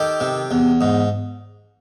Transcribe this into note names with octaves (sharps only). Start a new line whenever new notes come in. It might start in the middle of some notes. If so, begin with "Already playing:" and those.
Already playing: D#3 G4 A4
C3
E2
G#2